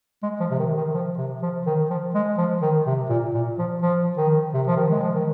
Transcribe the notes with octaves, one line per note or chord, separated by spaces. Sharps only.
G#3
F3
C3
D#3
D#3
F3
C3
F3
D#3
F3
G#3
F3
D#3
C3
A#2
A#2
F3
F3
D#3
C3
F3
D#3
G#3
F3
D#3